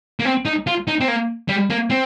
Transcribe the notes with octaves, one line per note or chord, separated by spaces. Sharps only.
A#3
C4
D#4
F4
D#4
C4
A#3
G3
A#3
C4